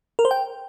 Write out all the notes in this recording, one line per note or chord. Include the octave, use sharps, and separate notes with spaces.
A#4
C5
G5